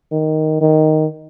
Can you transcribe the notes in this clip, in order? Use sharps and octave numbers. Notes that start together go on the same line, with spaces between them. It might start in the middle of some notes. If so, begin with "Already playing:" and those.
D#3
D#3